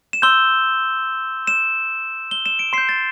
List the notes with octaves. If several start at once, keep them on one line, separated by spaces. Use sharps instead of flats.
E7
C6 E6 G6 G7
E7
G7
E7
D7
C6 G6 C7
A6